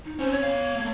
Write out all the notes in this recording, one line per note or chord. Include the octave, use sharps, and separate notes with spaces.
D#4
C4 C#4 C5
C#5
B3 F5
A3 A#3